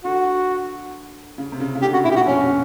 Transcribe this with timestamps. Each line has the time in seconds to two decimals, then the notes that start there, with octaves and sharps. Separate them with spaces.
0.04 D3 F#4
1.38 C#3
1.52 C3
1.60 C#3
1.75 C#3
1.82 D3 G4
1.93 C#3 F#4
2.04 B2 E4
2.11 G4
2.15 A#2 F#4
2.26 F2 C#4